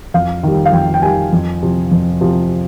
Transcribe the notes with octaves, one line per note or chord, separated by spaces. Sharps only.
F2 F5
D#3 G3
F5
F2 G5
G5
D#3 G3 G#5
F2
C3 F3
F2
C3 F3